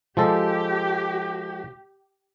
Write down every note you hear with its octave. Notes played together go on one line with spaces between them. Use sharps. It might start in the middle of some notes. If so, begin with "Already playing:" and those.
F3 G#3 G4 A4